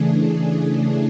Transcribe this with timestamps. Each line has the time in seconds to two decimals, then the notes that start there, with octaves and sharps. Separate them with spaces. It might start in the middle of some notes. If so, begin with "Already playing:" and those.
Already playing: C#3 E3 A3 D4 G#4